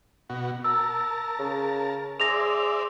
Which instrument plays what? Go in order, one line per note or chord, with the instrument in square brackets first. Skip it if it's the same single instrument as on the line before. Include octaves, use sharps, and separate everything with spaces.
[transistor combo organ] B2 F#4
[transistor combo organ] A#4 A5 [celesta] E6
[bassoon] C#3
[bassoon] G#4 [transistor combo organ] C5 D5 E5 [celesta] A#6 F7